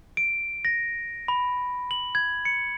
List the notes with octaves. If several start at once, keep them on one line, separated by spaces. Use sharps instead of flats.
D7
A#6
B5
F#7
G#6
C#7